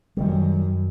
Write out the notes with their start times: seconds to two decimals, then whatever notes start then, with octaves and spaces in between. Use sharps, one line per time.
0.17 F#2 D#3 G3